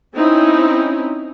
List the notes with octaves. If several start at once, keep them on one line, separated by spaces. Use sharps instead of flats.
C4 C#4 D#4 E4